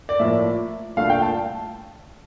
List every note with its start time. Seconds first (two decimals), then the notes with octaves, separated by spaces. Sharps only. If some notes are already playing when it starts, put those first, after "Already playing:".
0.09 D5
0.19 A2 F3 A#3 E5
0.97 C2 A#2 A3 D4 F5
1.09 G5
1.22 A5